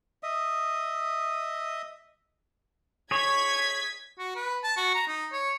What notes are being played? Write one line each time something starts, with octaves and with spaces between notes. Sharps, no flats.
D#5 E5 D#6
G#4 C#5 G#6 B6
F#4
B4
A5
F#4
A#5
D#4
C#5